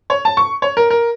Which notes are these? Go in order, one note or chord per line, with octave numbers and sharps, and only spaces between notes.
C#5
A5
C#6
C#5
A#4
A#4